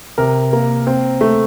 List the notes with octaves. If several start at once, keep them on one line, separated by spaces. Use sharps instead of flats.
C3 A#4
A#3
C4
A3